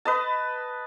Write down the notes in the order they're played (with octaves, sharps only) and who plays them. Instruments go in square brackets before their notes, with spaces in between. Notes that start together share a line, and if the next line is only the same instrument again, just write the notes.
[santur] B4 D#5 A5